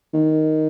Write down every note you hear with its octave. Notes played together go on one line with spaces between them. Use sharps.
D#3